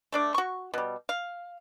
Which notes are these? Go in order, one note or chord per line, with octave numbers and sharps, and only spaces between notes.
A3 D4 D5
F#4 C#6
B2 G3
F5